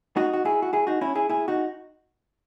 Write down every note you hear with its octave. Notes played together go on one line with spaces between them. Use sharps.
D#4 F#4
F#4
E4 G#4
F#4
E4 G#4
D#4 F#4
C#4 E4
E4 G#4
E4 G#4
D#4 F#4